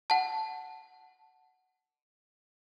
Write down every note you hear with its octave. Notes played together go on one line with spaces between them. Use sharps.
F#5 A5